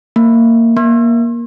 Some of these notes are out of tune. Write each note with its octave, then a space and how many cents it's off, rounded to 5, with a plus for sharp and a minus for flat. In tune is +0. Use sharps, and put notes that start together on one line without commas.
A#3 -20
A#3 +10